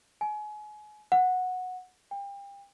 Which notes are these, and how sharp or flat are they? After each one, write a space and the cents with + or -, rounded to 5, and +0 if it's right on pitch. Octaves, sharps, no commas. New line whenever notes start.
G#5 +30
F#5 -10
G5 +35